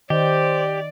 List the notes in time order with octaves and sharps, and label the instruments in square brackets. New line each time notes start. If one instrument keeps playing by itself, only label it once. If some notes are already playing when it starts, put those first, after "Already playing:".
[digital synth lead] D#3 [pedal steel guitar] G4 [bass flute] C5 [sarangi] D5